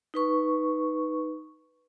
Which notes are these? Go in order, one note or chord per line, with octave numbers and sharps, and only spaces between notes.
D#4 B4 C#6